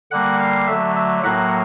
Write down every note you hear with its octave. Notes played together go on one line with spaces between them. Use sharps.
D3 G3 A#3 F#5
F5
D3 F#3 A3 E5
E5
A2 F#3 A#3 F#5